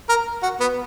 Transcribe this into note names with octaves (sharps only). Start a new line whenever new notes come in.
A#4
F#4
B3